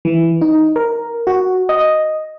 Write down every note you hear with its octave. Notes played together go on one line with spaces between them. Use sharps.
E3
D#4
A#4
F#4
D#5